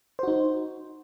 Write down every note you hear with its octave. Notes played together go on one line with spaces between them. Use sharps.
D#4 F#4 C5